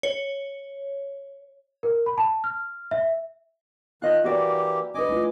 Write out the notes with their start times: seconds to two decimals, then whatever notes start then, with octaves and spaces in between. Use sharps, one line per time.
0.03 C#5
1.83 A#4
2.06 B5
2.18 A5
2.44 F6
2.91 E5
4.02 D#3 F4 D#5 F#6
4.24 E3 A#3 F#4 G4 D5
4.94 C#4 D4 B4 D#5 G#5 D6
5.09 A3 E4 F4